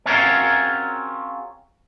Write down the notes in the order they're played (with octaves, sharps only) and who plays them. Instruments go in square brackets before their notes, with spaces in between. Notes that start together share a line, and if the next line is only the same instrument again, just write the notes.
[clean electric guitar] C4 C#4 F4 F#4 G#4 A#4